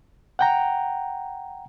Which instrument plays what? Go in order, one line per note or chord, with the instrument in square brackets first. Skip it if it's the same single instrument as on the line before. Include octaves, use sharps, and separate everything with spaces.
[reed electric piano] F#5 G5 A#5